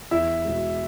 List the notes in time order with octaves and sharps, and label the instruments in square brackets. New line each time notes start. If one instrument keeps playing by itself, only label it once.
[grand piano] E2 [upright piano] E4 E5
[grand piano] B2 G#3